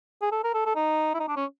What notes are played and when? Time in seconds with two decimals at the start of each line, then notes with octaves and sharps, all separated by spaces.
0.22 G#4
0.32 A4
0.44 A#4
0.54 A4
0.66 A4
0.76 D#4
1.14 E4
1.20 D#4
1.28 D4
1.36 C#4